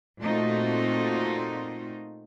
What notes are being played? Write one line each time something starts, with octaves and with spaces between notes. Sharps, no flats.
A#2 A3 C4 D#4 F4 F#4